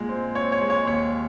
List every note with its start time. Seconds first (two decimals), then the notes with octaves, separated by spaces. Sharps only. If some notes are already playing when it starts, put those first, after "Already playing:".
Already playing: A#2 G#3
0.09 C4
0.35 C4 C#5
0.52 C#5
0.61 G#3
0.70 C#5
0.87 D#2 C#5